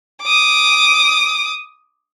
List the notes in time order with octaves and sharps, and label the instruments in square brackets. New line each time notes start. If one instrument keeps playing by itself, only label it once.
[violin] D6 D#6